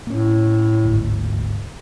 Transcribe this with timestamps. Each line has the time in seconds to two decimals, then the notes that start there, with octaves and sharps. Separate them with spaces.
0.07 A2 A#3 C#4
0.84 G1 D2 G#2